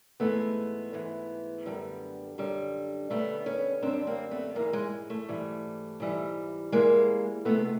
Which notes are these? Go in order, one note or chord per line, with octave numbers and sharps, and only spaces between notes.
G#2 E3 G#3 A3 B3
G#2 E3 G#3
F#2 D3 G3
F#2 D3 G3
F#2 D3 G3 A3 B3
B3 C#4
F#2 D3 G3 C4 D4
A#3 C4
A3 B3
G#2 E3 G3 G#3 A#3
G#3
A3
G#2 E3 G3
G#2 E3 G3
G#2 E3 G3 G#3 A#3
D2 C3 F3 G#3 A3 B3